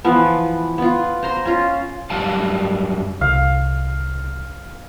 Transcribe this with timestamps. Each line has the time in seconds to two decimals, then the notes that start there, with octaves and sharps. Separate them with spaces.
0.04 E3 F3 B3
0.78 B3 F4
1.23 C5 A#5 C6
1.45 C#4 F4
2.10 F#2 G3 F5 A5
3.21 C2 F5